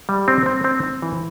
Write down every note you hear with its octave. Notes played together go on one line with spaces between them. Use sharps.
G3
C4
C4
C4
C4
E3